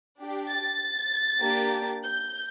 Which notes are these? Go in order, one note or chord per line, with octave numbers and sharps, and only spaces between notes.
D4 G4
A6
A#3 D4 G4
G6